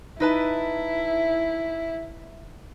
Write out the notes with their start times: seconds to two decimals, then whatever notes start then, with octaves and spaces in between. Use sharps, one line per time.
0.20 D#4 E4 B4 A5